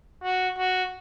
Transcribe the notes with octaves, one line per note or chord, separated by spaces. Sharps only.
F#4
F#4